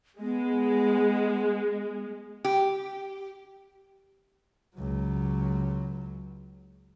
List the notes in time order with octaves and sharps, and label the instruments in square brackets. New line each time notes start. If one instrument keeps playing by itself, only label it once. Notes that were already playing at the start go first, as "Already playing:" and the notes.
[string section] G#3 [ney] B3
[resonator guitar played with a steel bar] G4
[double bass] C#2 F#3